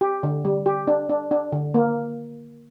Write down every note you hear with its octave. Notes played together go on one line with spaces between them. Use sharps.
G4
D3
G3
G4
D4
D4
D4
D3
A#3